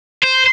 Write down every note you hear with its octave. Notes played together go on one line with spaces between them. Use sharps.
C5